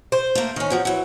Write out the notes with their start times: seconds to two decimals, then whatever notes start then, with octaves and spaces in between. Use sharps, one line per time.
0.12 C5
0.35 A3 A#3
0.56 D#3 C#4
0.70 C3 F3 F#3
0.85 E3 F#3